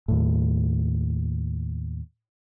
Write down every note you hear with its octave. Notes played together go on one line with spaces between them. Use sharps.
D#2 A2